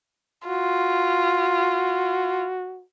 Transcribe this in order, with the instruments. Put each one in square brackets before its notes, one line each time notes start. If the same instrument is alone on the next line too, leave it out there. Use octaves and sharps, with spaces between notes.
[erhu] F4 [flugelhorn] F#4